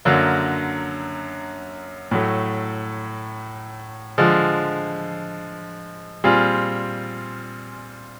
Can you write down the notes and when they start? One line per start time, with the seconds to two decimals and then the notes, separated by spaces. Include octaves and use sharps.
0.05 F#2 D3 F#3 A#3
2.11 A2 F#3 A3
4.18 D3 F3 G#3
6.24 A#2 G3 C4 F4 G#4